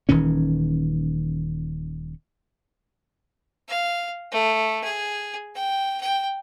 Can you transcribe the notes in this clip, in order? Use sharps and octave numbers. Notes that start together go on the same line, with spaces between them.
D#1 D#3 E3 C#4
F5
A3
G#4
G5
G5